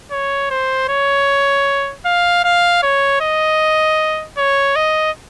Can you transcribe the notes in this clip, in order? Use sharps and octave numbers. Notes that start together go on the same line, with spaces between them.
C#5
C5
C#5
F5
F5
C#5
D#5
C#5
D#5